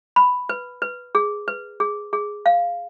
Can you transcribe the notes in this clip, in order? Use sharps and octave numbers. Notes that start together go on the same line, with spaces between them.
B5
B4
B4
G#4
B4
G#4
G#4
F5